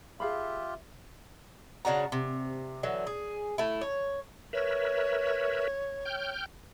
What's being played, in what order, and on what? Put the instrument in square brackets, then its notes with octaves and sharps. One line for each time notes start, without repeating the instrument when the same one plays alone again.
[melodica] F4 G4 [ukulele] G#4 F5 B5 [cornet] E5
[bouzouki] C#3 D4 F#4 A#5
C3
D3 E3 F#3
G#4
A3 E4
C#5
[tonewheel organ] A#4 B4 E5 [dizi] C#5
[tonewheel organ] G5 F6 G6